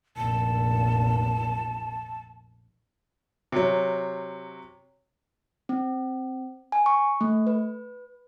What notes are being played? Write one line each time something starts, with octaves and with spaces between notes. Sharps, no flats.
F1 A#1 A5
C3 F#3 C#5
C4
G#5
C#6
A3
B4